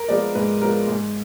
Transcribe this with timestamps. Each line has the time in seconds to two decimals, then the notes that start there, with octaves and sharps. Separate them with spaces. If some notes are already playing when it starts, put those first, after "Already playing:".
Already playing: A#4
0.09 F3 G#3 B3 D5
0.35 G#2 B4
0.61 F3 G#3 B3 A#4
0.88 G#2